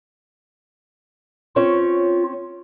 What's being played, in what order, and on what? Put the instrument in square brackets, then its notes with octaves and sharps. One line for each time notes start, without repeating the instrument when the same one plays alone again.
[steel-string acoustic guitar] C4 C#4 C#5 [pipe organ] F4